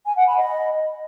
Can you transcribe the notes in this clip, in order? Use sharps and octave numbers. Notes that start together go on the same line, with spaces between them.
G#5
F#5
B5
D#5